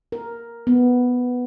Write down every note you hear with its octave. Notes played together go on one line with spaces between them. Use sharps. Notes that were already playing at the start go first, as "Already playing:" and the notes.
A#4
B3